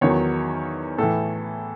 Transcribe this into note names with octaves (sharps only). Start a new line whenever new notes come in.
E2 D#3 F#3 C#5
A2 E3 A4